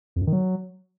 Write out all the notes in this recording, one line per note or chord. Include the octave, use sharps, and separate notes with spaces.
F2
F#2
D#3
F#3